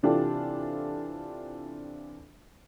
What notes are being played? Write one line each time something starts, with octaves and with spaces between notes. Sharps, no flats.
C3 E3 D4 F4 G4 A4